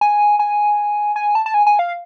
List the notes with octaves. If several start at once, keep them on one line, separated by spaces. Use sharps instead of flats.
G#5
G#5
G#5
A5
A5
G#5
G#5
F5